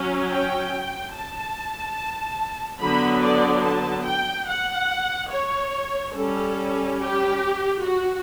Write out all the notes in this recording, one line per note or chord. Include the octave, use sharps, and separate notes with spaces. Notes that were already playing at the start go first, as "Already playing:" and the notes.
Already playing: F#3 C#4
G5
A5
D3 F#3 B3 B5
D5
A5
G5
F#5
C#5
G3 C#4 A4
G4
F#4